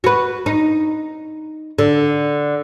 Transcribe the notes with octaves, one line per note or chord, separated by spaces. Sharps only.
F#4 B4
D#4
D3